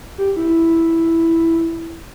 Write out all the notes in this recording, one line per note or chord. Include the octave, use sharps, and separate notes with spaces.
G4
E4